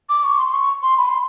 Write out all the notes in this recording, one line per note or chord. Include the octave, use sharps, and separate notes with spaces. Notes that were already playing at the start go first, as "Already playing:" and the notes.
D6
C#6
C6
C#6
C6
B5
C6